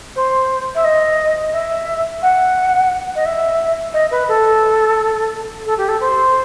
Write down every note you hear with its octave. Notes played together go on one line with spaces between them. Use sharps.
C5
E5
D#5
E5
F#5
D#5
E5
D#5
B4
A4
A4
G4
A4
C5